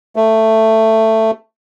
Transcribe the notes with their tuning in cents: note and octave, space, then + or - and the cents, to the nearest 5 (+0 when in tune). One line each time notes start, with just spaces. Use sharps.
A3 +10